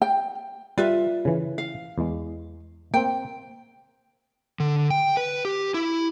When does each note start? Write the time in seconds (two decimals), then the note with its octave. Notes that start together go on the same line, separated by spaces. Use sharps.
0.02 G5
0.78 G3 F4 B4 E5
1.25 C#3 E3
1.58 F5
1.98 E2 G#3
2.94 A#3 C4 G5
4.60 D3
4.90 G5
5.17 B4
5.45 G4
5.74 E4